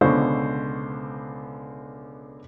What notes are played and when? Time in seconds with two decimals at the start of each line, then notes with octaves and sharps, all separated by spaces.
0.01 C#2 B2 D3 B3 C5 C#6